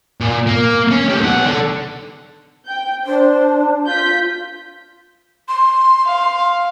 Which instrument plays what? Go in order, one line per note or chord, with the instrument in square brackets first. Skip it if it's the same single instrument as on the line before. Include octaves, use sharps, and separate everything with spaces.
[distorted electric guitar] A#2
A#3
C#4
A2 G4
B1 F#5
D4 A4
[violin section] G5 G6
[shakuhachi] D4 [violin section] C5
[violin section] F4 G6 B6
[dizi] C6
[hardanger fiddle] F5